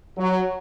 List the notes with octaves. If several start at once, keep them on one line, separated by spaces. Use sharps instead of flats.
F#3